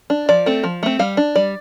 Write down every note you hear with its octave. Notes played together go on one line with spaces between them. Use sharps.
D4
F3 D5
A3 C4
F3
A3 C4
G3 F5
D4
G3 D5